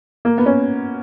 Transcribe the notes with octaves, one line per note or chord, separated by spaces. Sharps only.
A#3
B3
C#4